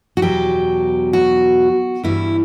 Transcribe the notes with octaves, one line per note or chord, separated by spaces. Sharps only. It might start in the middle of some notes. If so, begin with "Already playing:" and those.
F#4
E2 B2 F#3 G4
F#4
G2 E3 G3 E4